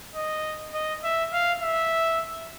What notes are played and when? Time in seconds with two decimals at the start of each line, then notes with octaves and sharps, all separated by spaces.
0.15 D#5
0.74 D#5
1.03 E5
1.33 F5
1.62 E5